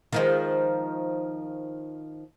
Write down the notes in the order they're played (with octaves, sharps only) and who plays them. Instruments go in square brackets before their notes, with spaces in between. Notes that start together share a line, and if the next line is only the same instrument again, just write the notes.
[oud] D#3 F3 G#3